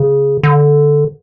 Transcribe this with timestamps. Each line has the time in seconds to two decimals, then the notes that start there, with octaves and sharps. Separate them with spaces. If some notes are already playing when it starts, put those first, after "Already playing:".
Already playing: C#3
0.43 D3